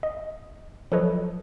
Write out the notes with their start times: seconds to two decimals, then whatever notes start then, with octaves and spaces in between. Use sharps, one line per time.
0.03 D#5
0.92 F3 F#3 A4 B4 C#5 D#5